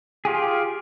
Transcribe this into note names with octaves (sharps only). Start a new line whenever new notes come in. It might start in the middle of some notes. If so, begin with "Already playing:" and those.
F4 G4 G#4